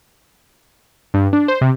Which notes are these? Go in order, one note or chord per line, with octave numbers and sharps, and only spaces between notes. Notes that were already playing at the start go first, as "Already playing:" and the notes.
G2
D4
C5
C3